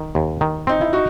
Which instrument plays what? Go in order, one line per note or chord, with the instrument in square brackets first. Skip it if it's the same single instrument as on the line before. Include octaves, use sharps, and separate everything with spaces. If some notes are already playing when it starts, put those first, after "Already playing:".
Already playing: [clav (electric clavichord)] D#3
D#2
D#3
[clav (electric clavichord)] C4 [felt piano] D#4
[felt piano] E4
D#4 F#4